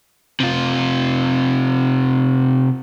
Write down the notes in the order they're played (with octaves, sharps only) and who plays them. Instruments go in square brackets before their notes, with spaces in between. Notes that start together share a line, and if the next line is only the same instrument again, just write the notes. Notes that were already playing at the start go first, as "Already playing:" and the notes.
[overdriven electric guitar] C3 F4